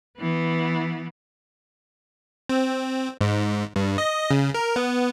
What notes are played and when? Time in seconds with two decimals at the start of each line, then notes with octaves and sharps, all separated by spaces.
0.18 E3 B3
2.49 C4
3.21 G#2
3.76 G2
3.98 D#5
4.30 C#3
4.54 A#4
4.76 B3